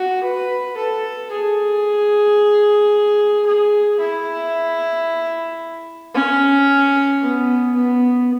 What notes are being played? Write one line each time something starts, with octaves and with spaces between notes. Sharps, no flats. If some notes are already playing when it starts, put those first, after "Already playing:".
Already playing: F#4
B4
A4
G#4
G#4
E4
C#4
B3
B3